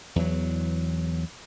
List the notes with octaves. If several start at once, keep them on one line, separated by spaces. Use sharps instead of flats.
E2 F#3